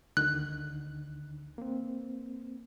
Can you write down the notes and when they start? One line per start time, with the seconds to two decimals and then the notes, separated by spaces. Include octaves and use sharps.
0.17 D2 D3 D#3 F#6
1.58 A#3 C4